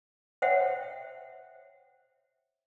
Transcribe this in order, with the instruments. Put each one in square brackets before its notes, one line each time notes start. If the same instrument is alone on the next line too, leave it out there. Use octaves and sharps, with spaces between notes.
[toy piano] C5 C#5 E5 F#5 G5